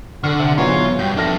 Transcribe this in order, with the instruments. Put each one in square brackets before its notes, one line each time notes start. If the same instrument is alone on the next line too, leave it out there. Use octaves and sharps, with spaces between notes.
[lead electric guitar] D3 [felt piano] A4 D5 F6 [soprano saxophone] F#5 [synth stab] C#6
[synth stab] C3
[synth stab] G#2 E3 F#3 [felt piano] B2 [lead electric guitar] F4 [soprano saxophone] C#5
[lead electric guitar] G2 [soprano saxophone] F#4 [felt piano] G5 [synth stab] G6
[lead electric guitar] F2 D4 [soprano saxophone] A4 [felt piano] E5 F6 A#6